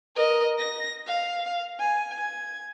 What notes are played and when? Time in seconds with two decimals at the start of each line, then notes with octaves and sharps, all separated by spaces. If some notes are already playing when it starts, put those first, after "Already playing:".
0.16 A#4 D#5
0.58 A#6
1.06 F5
1.79 G#5
2.20 G#6